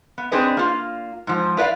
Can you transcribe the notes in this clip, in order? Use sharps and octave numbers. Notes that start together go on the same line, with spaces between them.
B3
C4 D4 G#4 B4 D#5
A#3 F4
G#2 F3
E4 B4 D5 F5